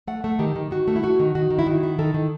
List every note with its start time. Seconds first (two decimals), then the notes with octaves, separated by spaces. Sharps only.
0.07 A3 F#5
0.24 A3
0.39 D#3 G4
0.56 D#3
0.71 D#3 F#4
0.88 A3
0.96 E4
1.03 A3 F#4
1.20 D#3
1.35 D#3 F#4
1.50 D#3
1.59 E4
1.66 D#3 F#4
1.83 E4
1.99 D#3 A4
2.14 D#3